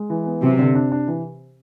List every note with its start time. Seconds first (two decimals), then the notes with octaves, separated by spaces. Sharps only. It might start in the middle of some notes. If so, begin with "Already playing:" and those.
Already playing: G#3
0.10 E3
0.26 B3
0.42 C3 F#3
0.59 D3
0.75 D4
0.92 D4
1.07 E3